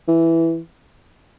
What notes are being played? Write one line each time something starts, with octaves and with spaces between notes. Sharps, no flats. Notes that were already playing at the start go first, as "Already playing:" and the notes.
E3